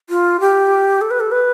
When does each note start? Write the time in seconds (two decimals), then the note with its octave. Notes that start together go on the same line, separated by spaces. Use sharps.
0.10 F4
0.40 G4
1.01 A4
1.11 B4
1.20 A4
1.32 B4